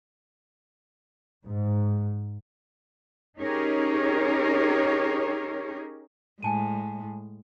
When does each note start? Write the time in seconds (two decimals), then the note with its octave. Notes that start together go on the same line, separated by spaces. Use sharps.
1.46 G#2
3.38 C#4 D#4 G4 G#4 A#4 C#5
6.43 A2 G#3 G#5 A5 D#7